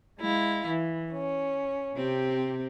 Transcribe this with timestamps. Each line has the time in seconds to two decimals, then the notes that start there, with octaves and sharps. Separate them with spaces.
0.19 G#3 E4 F5
0.67 E3
1.12 C#4
1.96 C3 C4 G4